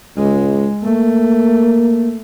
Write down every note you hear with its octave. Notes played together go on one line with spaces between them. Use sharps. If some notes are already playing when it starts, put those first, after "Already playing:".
C#2 G#3
A3 A#3